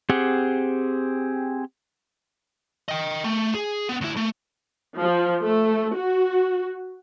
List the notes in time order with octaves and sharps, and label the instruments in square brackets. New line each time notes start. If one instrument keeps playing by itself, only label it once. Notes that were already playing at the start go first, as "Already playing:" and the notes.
[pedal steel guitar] C4 G4 G#4 F#5
[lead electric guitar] D#5 G5
A3
G#4
B3
D2 E4
A3
[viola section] F3
A3
F#4